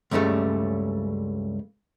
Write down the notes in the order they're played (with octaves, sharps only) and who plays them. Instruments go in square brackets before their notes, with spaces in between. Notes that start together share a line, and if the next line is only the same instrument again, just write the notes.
[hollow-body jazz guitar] C#2 G2 C#3 G3 A3